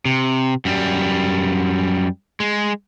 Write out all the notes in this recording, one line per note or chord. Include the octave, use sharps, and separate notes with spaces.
C3
F#2 G3
G#3